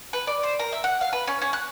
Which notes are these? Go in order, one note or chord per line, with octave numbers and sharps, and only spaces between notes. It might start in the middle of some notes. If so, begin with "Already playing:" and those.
B4
D5
C5
A#4
E5
F#5
F5
B4
C#4
C#4
F#6